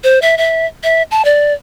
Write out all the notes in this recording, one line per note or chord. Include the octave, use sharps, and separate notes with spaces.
C5
E5
E5
E5
A5
D5